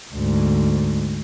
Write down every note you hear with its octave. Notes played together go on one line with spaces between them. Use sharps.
D2 G#2